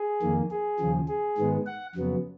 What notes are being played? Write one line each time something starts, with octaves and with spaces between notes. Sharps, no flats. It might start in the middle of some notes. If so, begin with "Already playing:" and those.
Already playing: G#4
F2 D#3 A#3
G#4
D#2 C#3 F3
G#4
G#2 D#3 G#3 B3
F#5
F2 C#3 F#3 B3